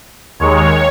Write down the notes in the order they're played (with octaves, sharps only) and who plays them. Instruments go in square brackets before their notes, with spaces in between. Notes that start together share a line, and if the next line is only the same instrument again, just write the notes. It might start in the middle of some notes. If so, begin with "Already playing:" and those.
[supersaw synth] D#2 D#3 G#3 C#5